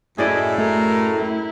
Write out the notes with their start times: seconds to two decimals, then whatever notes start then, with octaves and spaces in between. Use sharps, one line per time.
0.18 F#2 A2 E4 G#4 D5 D#5
0.58 A3 A#4
1.16 E4